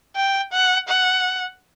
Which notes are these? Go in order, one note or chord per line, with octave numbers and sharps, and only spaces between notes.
G5
F#5
F#5